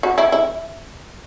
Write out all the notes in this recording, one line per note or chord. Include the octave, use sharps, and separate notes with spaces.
F#4
E4
E4